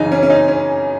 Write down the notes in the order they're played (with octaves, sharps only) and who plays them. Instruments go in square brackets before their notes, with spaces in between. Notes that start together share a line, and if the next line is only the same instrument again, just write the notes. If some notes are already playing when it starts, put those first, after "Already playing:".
Already playing: [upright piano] F#2 C#3 E3 D#4
C#4
C#4
D#4
C#4